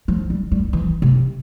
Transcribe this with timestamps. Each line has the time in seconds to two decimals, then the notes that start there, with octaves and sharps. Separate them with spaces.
0.08 F3
0.30 G3
0.52 G3
0.73 E3
1.02 C3